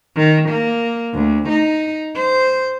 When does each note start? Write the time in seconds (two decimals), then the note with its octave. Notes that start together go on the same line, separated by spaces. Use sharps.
0.16 D#3
0.49 A#3
1.15 D2
1.49 D#4
2.17 C5